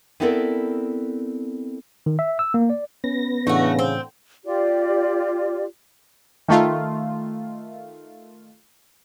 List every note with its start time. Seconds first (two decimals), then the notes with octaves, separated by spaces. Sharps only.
0.20 B3 C4 E4 A4 A#4 D5
2.06 D#3
2.19 E5
2.39 E6
2.54 A#3
2.70 D5
3.04 B3 C#4 A#6
3.47 A2 C#3 E3 A3 D4 F#4
3.79 C4
4.45 F4 G4 D5
6.48 D#3 A3 F4